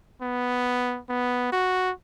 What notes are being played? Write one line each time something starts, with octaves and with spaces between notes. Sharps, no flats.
B3
B3
F#4